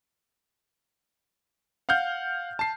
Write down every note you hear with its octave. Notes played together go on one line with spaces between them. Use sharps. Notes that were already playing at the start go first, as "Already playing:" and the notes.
F5 F#5 F6 G6
A5 C7